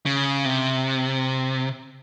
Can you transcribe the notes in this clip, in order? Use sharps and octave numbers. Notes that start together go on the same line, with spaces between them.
C#3
C3